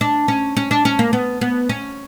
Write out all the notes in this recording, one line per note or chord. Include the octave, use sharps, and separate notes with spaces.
D4
C#4
C#4
D4
C#4
A#3
B3
B3
C#4